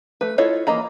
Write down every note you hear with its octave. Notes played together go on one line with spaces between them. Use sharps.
A3 B4
E4 F4 A4 C#5 D#5
E3 A#3 D#5 A#5 B5